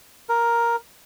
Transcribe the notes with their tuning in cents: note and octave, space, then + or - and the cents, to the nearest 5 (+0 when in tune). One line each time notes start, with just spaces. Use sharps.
A#4 +5